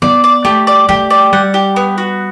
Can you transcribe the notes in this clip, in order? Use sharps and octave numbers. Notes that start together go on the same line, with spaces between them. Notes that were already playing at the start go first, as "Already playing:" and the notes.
B3 D5
D5
A3 G4
D5
A3 G4
D5
G3 F#5
G4
B3
F#4